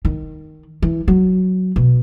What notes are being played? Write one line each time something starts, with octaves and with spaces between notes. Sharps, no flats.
D#3
E3
F#3
B2